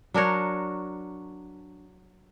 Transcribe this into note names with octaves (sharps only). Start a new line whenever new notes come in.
F#3 D4 A#4 C#5